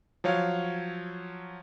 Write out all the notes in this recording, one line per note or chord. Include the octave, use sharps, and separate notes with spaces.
F3 F#3 C#5 F5